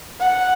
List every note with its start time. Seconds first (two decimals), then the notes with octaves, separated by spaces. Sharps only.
0.20 F#5